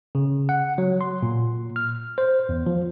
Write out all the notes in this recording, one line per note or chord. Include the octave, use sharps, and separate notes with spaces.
C#3
F#5
F#3
C6
A#2
F6
C5
E2
F3